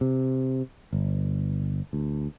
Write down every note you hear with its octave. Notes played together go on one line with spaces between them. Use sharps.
C3
G1
D2